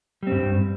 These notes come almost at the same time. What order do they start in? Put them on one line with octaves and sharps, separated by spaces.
G3 C4 G2